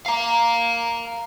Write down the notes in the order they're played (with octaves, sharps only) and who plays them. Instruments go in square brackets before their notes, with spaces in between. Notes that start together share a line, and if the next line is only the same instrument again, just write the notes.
[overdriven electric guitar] F5 A#5